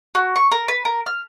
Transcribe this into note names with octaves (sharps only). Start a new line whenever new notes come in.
F#4
C#6
A#4
B4
A#4
F6